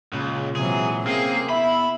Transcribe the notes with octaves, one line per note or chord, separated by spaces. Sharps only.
C#2 A#2 G#3 F4
C3 E3 F#3 G#4
A#3 C4 C#4 G#4 C#5 G5 C7
B3 E4 E5 B5